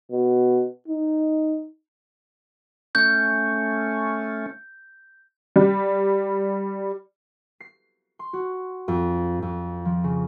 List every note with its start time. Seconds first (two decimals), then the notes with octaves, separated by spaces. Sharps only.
0.12 B2
0.88 D#4
2.95 A3 C#4 G6
5.56 G3
7.60 C7
8.19 C6
8.33 F#4
8.88 F2
9.42 F2
9.85 F3
10.04 C#3